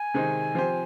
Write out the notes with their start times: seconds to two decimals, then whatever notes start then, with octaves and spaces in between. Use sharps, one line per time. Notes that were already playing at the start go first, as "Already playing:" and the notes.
Already playing: G#5
0.14 C3 D#3 G#3 C4 D#4
0.55 F3 C4 G4 C5